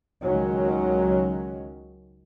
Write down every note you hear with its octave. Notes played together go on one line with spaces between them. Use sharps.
C#2 D#3 F#3 G#3 C#4